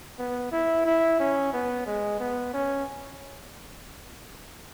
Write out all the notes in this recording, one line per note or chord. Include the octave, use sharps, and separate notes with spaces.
B3
E4
E4
C#4
B3
G#3
B3
C#4